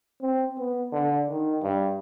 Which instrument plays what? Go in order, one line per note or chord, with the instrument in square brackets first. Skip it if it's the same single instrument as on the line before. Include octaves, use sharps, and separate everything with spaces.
[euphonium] C4
B3
D3
D#3
G2